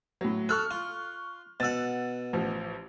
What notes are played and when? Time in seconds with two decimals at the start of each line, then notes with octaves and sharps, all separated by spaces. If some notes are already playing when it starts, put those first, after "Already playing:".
0.21 A2 F#3
0.49 A4 C#6 F6 F#6
0.71 F4
1.60 B2 F#5 E6 A6
2.33 A1 F3